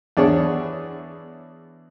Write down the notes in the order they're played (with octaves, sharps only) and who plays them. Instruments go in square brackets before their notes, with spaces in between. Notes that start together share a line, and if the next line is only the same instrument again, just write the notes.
[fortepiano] E2 D4 G#4 C#5